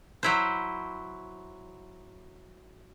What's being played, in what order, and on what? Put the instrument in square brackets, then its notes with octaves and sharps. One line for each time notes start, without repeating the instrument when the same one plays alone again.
[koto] F#3 E4 C5